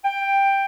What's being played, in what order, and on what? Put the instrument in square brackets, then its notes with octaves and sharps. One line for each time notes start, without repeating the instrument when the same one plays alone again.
[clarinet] G5